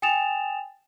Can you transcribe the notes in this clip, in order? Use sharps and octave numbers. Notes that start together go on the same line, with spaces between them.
G5 G#5 D#6 A6 E7 F7